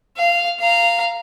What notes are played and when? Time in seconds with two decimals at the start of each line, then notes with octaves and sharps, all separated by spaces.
0.17 F5
0.60 F5 A#5